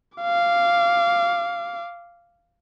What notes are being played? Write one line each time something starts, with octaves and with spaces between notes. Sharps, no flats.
F5 D6